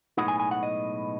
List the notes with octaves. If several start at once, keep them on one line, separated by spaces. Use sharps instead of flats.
B1 A2 G#3 B3 D#4 F#5
G#5
G#5
F#5
D#5